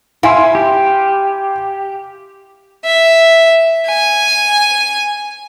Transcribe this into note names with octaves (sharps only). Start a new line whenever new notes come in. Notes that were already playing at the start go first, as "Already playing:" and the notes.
E4 F5 G#5 C6
G4
E5
G#5